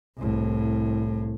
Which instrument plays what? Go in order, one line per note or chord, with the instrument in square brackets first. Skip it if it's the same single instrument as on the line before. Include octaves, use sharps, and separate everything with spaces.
[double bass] C2 A2